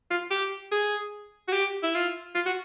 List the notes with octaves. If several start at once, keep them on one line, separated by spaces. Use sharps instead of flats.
F4
G4
G#4
F#4
G4
E4
F4
F4
F#4